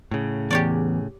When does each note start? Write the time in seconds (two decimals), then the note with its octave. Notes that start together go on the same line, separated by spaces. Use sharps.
0.11 A2 C#3
0.51 E2 G4 C#5 D5